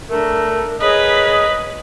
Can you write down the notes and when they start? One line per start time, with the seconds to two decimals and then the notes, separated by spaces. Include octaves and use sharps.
0.10 A3 D4 A#4
0.80 G#4 A#4 B4 C#5 D#5